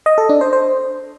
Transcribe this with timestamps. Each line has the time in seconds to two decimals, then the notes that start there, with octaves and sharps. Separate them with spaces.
0.06 D#5
0.18 A4
0.29 D4
0.41 C5
0.53 C5